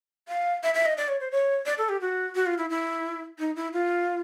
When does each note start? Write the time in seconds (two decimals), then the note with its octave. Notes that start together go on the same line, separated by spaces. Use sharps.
0.28 F5
0.63 E5
0.74 E5
0.86 D#5
0.97 D5
1.08 C#5
1.21 C5
1.32 C#5
1.66 D5
1.78 A4
1.89 G4
2.01 F#4
2.35 F#4
2.46 F4
2.58 E4
2.70 E4
3.39 D#4
3.56 E4
3.73 F4